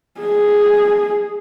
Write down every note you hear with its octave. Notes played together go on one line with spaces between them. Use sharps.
G#4